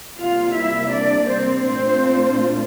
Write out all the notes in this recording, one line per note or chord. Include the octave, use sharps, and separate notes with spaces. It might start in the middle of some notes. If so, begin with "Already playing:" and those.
C3 G3 A#3 F4 F5
E4 E5
D4 D5
C4 C5
A#2 A3 C4 D4 F4 C5